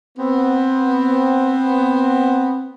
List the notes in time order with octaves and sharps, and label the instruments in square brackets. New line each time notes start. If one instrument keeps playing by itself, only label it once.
[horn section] B3 C4